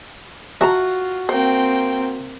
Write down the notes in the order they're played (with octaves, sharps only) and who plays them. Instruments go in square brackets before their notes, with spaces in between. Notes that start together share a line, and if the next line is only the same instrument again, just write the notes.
[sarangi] F4 [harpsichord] F#4 F#5 [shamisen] E5 A5 A#5
[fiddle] A#3 C4 [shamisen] C5 [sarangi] G5